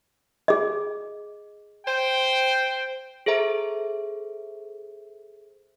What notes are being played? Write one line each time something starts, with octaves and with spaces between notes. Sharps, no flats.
G#4 D#5
C5 G5
G#4 A4 C5 E5 A#5